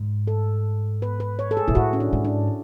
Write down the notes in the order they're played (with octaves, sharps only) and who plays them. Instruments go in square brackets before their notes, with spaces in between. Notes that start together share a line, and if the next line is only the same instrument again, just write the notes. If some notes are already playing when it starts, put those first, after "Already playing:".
Already playing: [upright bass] G#2
[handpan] A4
B4
B4
C#5
A4
G#4
[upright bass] B2 [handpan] E4
[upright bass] A2 [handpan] F#4
[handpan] C#4
D4
[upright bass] G#2
[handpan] D4